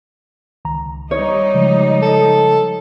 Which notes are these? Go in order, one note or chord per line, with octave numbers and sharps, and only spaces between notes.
C#2 D#3 A#5
G3 D#4 C#5
C#3 F3 G#3
A4